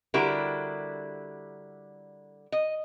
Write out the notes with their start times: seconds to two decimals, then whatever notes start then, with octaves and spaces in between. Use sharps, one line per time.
0.14 D3 G3 E4 F#4 G4 A#4
2.52 D#5